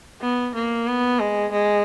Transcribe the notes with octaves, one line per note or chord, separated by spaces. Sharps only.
B3
A#3
B3
G#3
G#3